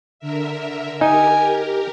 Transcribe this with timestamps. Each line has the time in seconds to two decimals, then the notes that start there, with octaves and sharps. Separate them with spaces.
0.19 D3 A#4 E5
1.01 D#4 G4 A#4 G#5